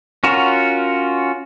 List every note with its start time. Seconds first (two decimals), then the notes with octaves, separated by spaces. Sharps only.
0.24 C#4 F4 F#4 A#4